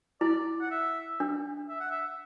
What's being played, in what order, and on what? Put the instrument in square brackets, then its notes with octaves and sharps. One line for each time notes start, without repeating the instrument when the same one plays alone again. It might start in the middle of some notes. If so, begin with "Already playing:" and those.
[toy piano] E4 [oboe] D5
[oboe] F#5
E5
[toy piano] D4
[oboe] E5
F#5
E5